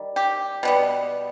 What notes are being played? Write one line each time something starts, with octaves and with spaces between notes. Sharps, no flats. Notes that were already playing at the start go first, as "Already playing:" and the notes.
Already playing: D#3 G3
G4
B2 G3 B3